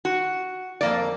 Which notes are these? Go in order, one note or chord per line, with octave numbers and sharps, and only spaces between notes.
F#4
F2 A#3 D5